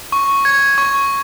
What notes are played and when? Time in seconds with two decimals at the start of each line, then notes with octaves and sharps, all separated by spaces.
0.12 C#6
0.45 G#6
0.78 C#6